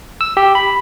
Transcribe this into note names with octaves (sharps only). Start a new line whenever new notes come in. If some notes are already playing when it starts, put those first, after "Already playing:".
E6
G4
B5